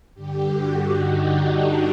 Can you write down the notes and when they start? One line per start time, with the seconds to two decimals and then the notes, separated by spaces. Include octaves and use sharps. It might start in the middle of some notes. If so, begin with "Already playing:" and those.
0.14 G2 D3 G4
0.56 F#4
0.96 D#4
1.38 D4